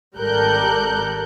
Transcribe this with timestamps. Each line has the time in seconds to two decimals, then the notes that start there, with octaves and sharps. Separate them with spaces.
0.16 G#1 G3 A4 A#4 F#6 G6